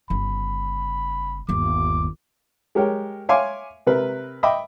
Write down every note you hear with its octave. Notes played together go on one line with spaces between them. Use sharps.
G1 C#3 B5
G1 D#2 D6
G#3 G4 A#4 C#5 G5
C#5 E5 F5 G#5 C6 D6
C3 A#4 B4
D#5 E5 G5 B5 D6